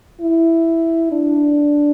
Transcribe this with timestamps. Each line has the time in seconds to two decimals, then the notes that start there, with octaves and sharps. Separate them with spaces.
0.21 E4
1.12 D4